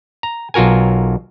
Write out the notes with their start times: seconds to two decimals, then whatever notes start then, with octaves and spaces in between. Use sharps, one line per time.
0.23 A#5
0.54 B1 F4 F#4 A#4 G#5